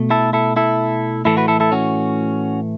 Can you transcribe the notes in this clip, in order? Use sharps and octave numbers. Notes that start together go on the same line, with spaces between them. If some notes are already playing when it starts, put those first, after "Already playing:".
Already playing: B2 A3
E4 A4
E4 A4
E4 A4
A2 E3 A3 E4 A4
F#4 B4
E4 A4
E4 A4
C#4 F#4